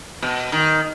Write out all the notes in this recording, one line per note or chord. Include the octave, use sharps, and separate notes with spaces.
B2
D#3